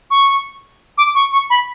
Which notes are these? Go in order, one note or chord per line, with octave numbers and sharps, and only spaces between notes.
C#6
D6
C#6
C#6
B5